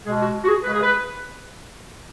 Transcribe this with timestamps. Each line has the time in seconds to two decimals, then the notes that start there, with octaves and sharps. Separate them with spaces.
0.05 B2 G#3 G#4
0.20 F#4
0.44 F#4
0.48 G#4
0.63 C#3 G#3 B4
0.72 G#4
0.81 B4